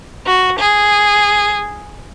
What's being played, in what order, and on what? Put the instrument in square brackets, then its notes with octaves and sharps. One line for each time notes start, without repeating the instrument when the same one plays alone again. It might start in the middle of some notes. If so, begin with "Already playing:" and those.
[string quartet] F#4
G#4